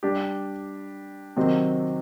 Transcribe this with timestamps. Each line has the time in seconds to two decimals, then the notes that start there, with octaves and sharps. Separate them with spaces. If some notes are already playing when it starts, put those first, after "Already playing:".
0.03 G3 D4 G4
1.36 C3 D#3 F#3 C4